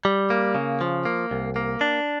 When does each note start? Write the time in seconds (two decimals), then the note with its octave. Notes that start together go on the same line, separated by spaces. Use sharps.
0.05 G3
0.30 A#3
0.55 C#3
0.81 F3
1.05 A#3
1.31 C2
1.56 A#3
1.81 D4